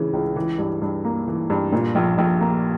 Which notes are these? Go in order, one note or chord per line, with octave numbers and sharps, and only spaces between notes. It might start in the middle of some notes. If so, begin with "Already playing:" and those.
Already playing: C#3 E3
C#2
E3
G2
G2
A#3
E3
G2
A#2
A#1
A#1
A#3